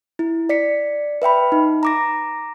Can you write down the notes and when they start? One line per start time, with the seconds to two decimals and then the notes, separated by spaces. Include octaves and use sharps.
0.19 E4
0.49 D5 B6 C#7
1.22 B4 E5 G5 B5
1.52 D#4
1.83 A#5 D6 A#6